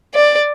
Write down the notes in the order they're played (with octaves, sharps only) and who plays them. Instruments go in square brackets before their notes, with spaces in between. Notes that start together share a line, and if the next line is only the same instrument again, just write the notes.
[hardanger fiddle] D5